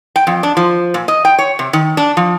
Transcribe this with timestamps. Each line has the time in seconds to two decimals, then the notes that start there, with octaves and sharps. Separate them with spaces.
0.16 G5
0.27 F2
0.43 D4
0.57 F3
0.94 A#2
1.08 D#5
1.25 G5
1.38 C#5
1.59 C3
1.73 D#3
1.97 D4
2.17 F3